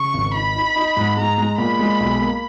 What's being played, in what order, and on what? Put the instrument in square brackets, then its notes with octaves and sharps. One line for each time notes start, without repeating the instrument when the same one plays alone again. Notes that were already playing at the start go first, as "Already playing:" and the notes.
Already playing: [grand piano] C#3 [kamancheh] C#6
[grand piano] G#1
[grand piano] D#4 [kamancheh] B5
[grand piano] D#4
D#4
G#2
[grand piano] G#3 [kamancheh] A#5
[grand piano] G#3
[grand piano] A#2 [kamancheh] B5
[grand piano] G#3
B1
A#3